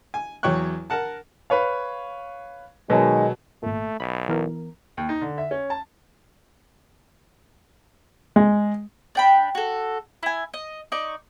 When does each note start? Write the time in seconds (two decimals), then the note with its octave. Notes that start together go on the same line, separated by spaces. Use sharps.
0.14 G#5
0.43 E2 F#3 C#5 G5 C#6 F#6
0.90 A#4 F#5 A5
1.50 B4 C#5 F5
2.90 B2 D#3 F#3 G#3
3.63 G#1 A#2 A3
4.00 B1 B5
4.29 E3 B3 A#4
4.97 D#2
5.09 D#4
5.22 D3
5.38 E5
5.51 C#4
5.70 A5
8.36 G#3
9.15 D4 G5 B5
9.55 F#4 A4
10.23 E4 G#5
10.53 D#5
10.92 D#4 D5 C#6